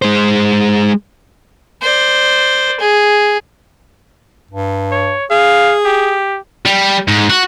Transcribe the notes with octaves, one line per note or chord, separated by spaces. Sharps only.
G#3 C5
C5 D5
G#4
G2
C#5
G#4 F5
G4
G3
G#2
F#4